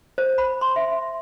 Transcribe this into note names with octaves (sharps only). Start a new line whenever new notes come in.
C5
B5
C6
E5